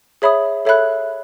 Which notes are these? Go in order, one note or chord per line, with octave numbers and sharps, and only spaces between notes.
G#4 C#5 E5 B5 D#6
A4 C#5 E5 B5 F#6